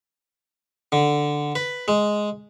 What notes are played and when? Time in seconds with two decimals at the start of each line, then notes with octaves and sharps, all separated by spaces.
0.92 D3
1.55 B4
1.88 G#3